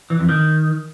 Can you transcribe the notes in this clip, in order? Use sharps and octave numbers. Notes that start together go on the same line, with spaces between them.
E3
F2
D#3